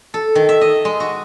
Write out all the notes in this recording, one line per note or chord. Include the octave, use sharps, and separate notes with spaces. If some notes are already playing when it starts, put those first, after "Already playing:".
A4
D#3
E5
D#5
G#3
F#4